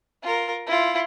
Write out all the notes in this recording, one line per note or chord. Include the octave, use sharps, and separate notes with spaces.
F4 A#4
E4 F4